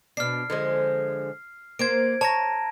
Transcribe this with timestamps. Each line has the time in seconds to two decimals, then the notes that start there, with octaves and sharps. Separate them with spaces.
0.17 B2 D4 F6 C7
0.50 D3 F3 G#3
1.79 A#3 C5 G#6 D7
2.21 C#5 A5 A#5 A#6